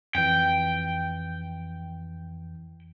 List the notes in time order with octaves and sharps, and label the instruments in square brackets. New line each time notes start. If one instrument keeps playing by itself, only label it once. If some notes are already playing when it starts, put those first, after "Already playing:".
[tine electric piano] F2 E3 [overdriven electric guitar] G5